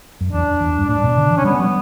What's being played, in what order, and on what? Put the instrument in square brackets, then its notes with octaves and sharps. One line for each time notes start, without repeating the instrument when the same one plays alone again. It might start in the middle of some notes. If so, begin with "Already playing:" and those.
[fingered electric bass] F#2
[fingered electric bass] E2 [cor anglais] D4
[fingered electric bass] E2
G2
[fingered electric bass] A2 [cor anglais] D4
[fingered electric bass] B2
D3
E3
[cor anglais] C#4
[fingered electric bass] G3 [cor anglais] B3
[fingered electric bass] F#3